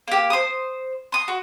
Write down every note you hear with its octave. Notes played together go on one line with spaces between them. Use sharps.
A#3 G4
C5 D#6
C6 D#6
F#4